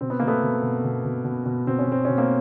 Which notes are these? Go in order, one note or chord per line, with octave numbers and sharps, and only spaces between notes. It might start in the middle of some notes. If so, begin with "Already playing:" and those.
B2 C4
B3
B2 A#3
A3 B3
B2
B2
B2
B2
B2
B2
B2 C4
C#4
B2 C4
B2 C#4
A#3 C4